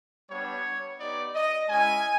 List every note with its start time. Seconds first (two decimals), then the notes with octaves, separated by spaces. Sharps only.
0.30 G3 B3 D4 C#5
0.99 B3 D#4 G4 D5
1.35 D#5
1.69 G#3 C#4 E4 G#5